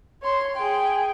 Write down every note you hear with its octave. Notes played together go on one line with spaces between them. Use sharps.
C#5 C6
G#4 G5